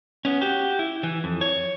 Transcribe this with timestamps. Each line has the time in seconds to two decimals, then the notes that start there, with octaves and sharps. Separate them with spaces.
0.25 B3 C#4
0.41 F#4 G4
0.79 E4
1.03 E3
1.24 F2
1.41 C#5